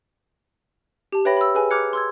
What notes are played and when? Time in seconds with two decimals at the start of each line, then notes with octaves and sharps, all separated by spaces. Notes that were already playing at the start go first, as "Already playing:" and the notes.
1.12 G4 A5
1.25 B4 C#5 E5 G5 B5 A#6
1.37 B5 E6
1.55 G#4 B4 G#5
1.71 A#5 D6 F6 F#6 G#6 C#7
1.93 C6 E6 G#6